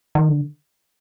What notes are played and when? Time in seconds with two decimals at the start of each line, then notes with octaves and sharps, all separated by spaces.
0.15 D#3
0.29 D3